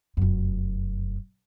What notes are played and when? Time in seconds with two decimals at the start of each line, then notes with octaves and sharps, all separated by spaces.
0.17 F1 F#2